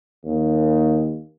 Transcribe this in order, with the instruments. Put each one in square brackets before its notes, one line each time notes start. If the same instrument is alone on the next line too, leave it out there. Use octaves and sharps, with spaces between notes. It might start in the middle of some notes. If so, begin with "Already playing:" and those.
[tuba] D#2